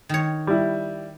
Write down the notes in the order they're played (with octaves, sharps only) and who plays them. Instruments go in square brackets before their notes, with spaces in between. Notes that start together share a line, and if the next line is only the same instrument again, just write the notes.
[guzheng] D#3 C#5
[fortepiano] G3 E4